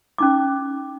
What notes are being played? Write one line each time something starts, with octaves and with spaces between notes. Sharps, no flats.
C#4 D#4 D6